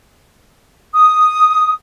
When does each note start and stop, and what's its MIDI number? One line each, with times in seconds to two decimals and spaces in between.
0.93 1.72 87